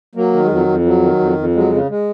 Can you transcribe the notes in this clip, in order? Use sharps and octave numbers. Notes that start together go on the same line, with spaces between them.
F#3 A#3
D#3
G#3
F2 F#3
F2
F#3
D#3
F2
F2
F#3 G#3
C#3
G#3